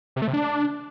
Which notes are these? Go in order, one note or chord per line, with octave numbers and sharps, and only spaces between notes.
C3
A3
C3
D4